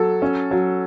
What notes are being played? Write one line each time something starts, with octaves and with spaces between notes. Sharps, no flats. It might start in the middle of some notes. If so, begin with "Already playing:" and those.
Already playing: F#3 A4
C#4
F#3